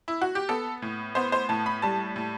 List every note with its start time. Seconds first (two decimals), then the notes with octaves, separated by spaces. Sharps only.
0.08 E4
0.21 F#4
0.35 G4
0.49 B3 A4
0.82 A2
1.15 B3 C5
1.32 C5
1.49 A2 A5
1.66 B5
1.82 G3 A5
2.16 A2